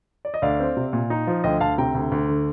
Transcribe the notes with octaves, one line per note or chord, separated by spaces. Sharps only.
D5
D#5
D2 D5 F5
C4
C3
A#2
D#4
F3
D2 D#5 G5
D2 F5 A5
C3 G5 A#5
D2
D2
D3